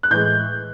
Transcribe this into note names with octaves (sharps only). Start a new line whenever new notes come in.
F#6
A2 E3 G#3 G6